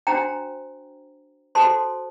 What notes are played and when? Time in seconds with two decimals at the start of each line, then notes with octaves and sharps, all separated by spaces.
0.07 D4 F#4 C5 G5 A#5
1.55 F#4 A4 C5 A5 C6